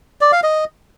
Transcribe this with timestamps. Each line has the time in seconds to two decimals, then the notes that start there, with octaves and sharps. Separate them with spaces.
0.21 D5
0.32 F5
0.43 D#5